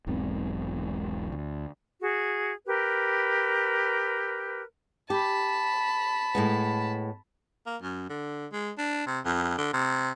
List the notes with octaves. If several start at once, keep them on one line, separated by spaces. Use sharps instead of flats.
E1 B1 G#2 C4
D2
F#4 G#4
G4 A#4 B4
G4 A5 B5
A2 G#3 B3
A#3
F#2
D3
G#3
D4
C3
F2
D3
C3